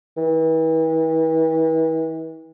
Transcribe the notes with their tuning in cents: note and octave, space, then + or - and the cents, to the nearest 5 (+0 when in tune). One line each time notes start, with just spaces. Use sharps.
E3 -40